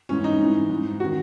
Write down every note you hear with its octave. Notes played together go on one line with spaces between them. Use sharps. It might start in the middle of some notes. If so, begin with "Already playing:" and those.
G#2 E3 C#4
D#4
G#2 E3
G#2 E3
D#3 F#4